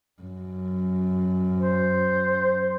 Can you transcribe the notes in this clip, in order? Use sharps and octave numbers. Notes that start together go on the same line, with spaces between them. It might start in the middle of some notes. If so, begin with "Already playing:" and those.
F#2
C5